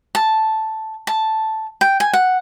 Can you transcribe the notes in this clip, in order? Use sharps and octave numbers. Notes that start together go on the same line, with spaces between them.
A5
A5
G5
G#5
F#5